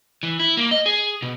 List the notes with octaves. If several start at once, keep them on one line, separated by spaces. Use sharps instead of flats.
E3
E4
A#3
D#5
G#4
B2